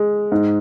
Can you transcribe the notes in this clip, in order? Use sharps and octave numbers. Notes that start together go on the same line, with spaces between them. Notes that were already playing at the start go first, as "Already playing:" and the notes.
Already playing: G#3
G#2